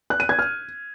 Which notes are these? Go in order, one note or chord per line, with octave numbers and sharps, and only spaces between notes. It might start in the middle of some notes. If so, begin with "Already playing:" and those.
F#6
D#7
G#6
F6